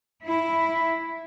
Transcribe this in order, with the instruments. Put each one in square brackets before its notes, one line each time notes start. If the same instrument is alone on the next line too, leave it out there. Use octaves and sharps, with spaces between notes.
[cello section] E4